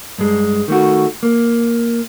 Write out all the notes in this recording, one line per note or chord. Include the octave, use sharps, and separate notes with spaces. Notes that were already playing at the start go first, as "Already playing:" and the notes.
G2 G#3
D#3 A3 F#4
A#3